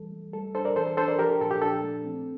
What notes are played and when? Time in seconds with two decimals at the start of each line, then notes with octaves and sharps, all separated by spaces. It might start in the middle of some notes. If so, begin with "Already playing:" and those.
Already playing: E3 G3 A4
0.12 A3
0.33 G3 A4
0.55 D4 A4 C5
0.65 A#4 D5
0.76 E3 A4 C5
0.87 A4
0.97 D4 A4 C5
1.08 A#4 D5
1.19 F3 G4 A#4
1.30 A4
1.41 A#2 A4
1.51 G4
1.61 D4 A4
1.84 A3
2.05 C4